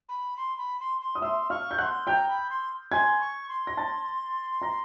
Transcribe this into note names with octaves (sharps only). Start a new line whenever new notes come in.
B5
C6
B5
C6
C6
D#6
E5 C6 E6
F5 C#6 F6
G6
F#5 C6 C#6 F#6
G5 A#5 G6
B5
C6
G#5 C6 G#6
C#6
C6
A#6
A5 A6
A#5 A#6